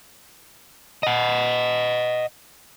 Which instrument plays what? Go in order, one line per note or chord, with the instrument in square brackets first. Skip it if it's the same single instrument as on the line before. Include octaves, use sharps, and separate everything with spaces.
[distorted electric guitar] D#5 F#5